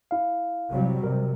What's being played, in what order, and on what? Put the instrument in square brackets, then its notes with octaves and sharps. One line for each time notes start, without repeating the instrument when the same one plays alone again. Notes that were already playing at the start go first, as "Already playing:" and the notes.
[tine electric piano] E4 F5
[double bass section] C3 F#3 G3
[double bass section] C3 [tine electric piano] A#4